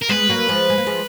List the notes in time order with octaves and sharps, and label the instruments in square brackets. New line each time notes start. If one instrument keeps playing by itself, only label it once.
[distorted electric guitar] A#4
[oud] G#3 B3 [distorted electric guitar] B4
[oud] F#3 A#3
F3 G#3
G#3
A#3
F3 G#3